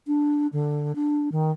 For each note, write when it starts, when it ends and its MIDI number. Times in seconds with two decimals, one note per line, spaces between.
0.07 0.47 62
0.53 0.95 50
0.95 1.29 62
1.32 1.51 51